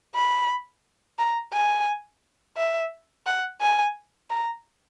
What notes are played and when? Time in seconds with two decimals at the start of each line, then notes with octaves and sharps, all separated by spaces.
0.15 B5
1.19 A#5
1.53 G#5
2.57 E5
3.26 F#5
3.61 G#5
4.30 A#5